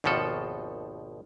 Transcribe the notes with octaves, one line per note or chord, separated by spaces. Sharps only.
G#1 D#2 B2 F3 A4